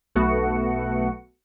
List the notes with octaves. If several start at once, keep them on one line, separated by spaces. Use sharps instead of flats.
B1 A3 B3 F#4 C#7